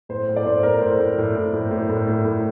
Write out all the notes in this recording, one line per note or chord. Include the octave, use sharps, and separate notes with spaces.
A2 C5
A2
D5
A2 C5
A2 A#4
A2 C5
A2
A2
A2
A2
A2
A2
A2
A2